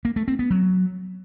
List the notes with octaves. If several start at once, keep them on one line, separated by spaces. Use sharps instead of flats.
A#3
A3
C4
B3
F#3